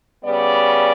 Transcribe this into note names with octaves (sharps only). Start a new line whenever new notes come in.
C#3 G3 B3 D5